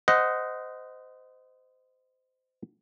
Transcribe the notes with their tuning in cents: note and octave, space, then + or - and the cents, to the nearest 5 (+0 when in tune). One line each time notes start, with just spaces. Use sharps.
C5 -25 D#5 +0 F#5 +0